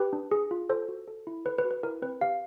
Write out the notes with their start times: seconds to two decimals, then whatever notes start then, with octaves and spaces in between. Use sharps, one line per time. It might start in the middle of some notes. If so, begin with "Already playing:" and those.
Already playing: G4 B4
0.13 D4
0.31 G#4
0.51 F4
0.69 A4 C5
0.88 F#4
1.08 A4
1.27 E4
1.45 A4 B4
1.58 B4
1.65 F#4
1.71 B4
1.83 E4 A#4
2.02 C4 B4
2.21 G4 F5